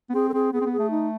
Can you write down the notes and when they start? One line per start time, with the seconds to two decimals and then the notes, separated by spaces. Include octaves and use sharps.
0.09 B3
0.14 C4 G#4
0.29 A4
0.33 C4 G#4
0.53 B3 G#4
0.61 C4
0.65 B3
0.73 G#4
0.79 A3
0.91 D#4